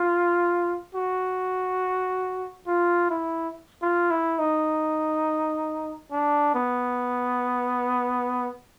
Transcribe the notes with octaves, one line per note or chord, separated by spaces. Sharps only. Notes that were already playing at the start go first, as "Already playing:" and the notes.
Already playing: F4
F#4
F4
E4
F4
E4
D#4
D4
B3